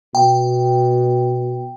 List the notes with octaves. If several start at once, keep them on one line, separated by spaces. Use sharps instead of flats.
B2 G5